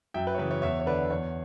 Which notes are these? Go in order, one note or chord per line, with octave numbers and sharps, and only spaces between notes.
F#2 E5 G5
B4
C#5
C#3 E3 B4
C#5
E2 C#5 E5
C#5
D3 B4 D5
E2 C#5